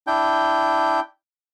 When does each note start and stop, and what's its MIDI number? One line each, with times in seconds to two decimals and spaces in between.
0.07 1.00 62
0.07 1.00 64
0.07 1.00 79